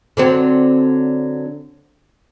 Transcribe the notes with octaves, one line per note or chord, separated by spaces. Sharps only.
D3 F#3 C4